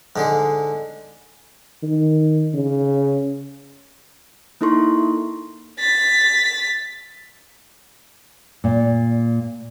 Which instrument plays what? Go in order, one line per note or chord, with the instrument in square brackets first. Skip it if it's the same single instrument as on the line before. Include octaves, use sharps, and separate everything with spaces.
[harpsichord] G#2 D3 G#3
[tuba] D#3
C#3
[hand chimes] A#3 D#4 E4 A4 C6 C#6
[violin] A6 B6
[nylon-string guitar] A#2